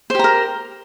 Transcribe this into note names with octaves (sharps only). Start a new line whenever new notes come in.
G4 A#4 C5 A#5